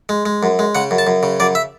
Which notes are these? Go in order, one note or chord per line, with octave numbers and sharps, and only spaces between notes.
G#3
G#3
F#2
G#3
C#3 F#5
F#2
A5
F#2
C#3
F#2 D5
E5